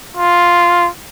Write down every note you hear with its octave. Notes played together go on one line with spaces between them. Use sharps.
F4